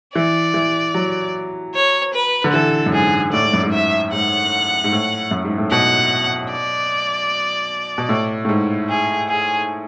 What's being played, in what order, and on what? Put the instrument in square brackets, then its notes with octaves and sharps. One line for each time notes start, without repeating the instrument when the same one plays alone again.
[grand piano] E3 [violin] D5
[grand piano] E3
F#3
[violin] C#5
B4
[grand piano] D3
[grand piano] E3 [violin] A4
[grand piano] F#2
[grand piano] G#2 [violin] G#4
[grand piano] A2 [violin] D5
[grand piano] G#2
F#2
G#2
[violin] E5
[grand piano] G#2 [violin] F#5
[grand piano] G#2
A2
F#2
G#2
A2
[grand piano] B2 [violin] F#5
[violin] D5
[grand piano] B2
A2
A2
G#2
[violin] G#4
G#4